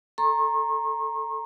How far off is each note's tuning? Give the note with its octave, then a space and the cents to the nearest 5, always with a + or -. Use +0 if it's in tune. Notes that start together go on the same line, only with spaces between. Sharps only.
A4 +0 A#5 +0 C#6 -45